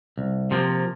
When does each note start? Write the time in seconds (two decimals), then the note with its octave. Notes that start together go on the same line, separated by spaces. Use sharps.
0.18 C2
0.51 C3 F3 A#3